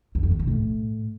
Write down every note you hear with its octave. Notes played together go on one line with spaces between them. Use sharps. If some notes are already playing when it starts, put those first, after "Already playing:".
E2
F2
C#3
C3
A2